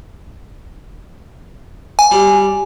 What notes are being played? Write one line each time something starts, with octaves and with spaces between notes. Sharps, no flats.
G#5
G3